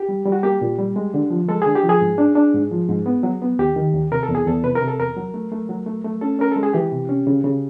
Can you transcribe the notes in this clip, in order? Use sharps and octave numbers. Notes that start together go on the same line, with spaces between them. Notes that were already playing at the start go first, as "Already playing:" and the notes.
Already playing: G4
G3
G3
F#4
A#3 G4
A#2
G3
G#3
D3
F3
G#3 A4
D3 G#4
G4
F3
G#4
G#2
D4
D4
G#2
F3
G#2
B3
F#3
B3
D#2 G4
D#3
D#2
C3 A#4
A4
E2
G#4
E2 A4
C3 B4
A#4
C3
A4
E2 A#4
F#3
A3
A3
F#3
A3
A3
C#4 A4
C#4 A#4
G#3 A4
G#4
E3 G4
C3
C#4
C#3
C#3